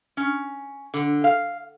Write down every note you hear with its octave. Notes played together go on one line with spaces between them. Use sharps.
C#4
D3
F5